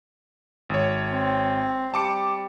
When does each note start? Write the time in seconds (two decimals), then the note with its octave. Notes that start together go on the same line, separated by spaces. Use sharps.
0.69 G#1 C#5
1.09 C4
1.94 G3 A5 D6 C#7